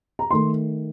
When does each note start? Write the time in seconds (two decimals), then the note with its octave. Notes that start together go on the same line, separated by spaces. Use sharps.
0.19 A#5
0.31 D#3 A3 C6